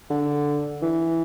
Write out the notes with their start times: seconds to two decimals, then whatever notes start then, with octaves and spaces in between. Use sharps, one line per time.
0.10 D3
0.82 E3